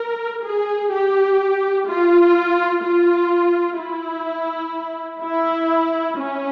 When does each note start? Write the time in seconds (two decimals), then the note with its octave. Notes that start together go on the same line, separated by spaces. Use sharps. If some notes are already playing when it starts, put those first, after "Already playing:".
Already playing: A#4
0.44 G#4
0.91 G4
1.87 F4
2.83 F4
3.79 E4
5.23 E4
6.19 C#4